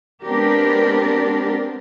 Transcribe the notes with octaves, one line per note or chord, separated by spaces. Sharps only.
G#3 B3 C4 D4 G4 A#4